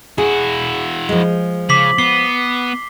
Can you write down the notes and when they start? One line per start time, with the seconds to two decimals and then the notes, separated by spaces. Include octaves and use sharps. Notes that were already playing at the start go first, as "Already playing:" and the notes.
0.18 E4 F#4 G#4
1.09 F3 G#3
1.69 C#3 D6 B6 F#7
1.98 B3 C7 G7